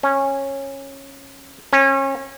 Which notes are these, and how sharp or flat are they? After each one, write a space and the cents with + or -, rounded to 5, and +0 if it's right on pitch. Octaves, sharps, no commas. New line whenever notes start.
C#4 -15
C#4 -30